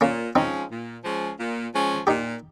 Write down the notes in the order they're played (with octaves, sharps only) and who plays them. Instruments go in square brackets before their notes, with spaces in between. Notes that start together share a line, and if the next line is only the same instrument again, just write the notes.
[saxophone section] A#2 [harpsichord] A#3 C#4
[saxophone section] F3 G#3 C#4 [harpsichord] C4 D#4
[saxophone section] A#2
F3 G#3 C#4
A#2
F3 G#3 C#4
[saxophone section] A#2 [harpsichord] D#4 G4